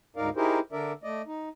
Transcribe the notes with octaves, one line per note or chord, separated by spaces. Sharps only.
D2 G#2 D#4 A#4 D5 F5
D#4 E4 G4 G#4 A#4 C5
D3 D4 A#4 D5 E5
A3 D5 D#5
D#4